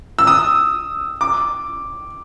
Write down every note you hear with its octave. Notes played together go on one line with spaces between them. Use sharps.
E6
D#6
D6